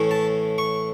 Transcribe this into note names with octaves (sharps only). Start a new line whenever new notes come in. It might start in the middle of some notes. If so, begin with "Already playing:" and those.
Already playing: A2 E3 A3 C#4 E4
A5
C#6